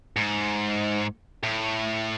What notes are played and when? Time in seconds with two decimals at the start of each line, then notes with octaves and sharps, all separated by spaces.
0.17 G#2
1.43 A2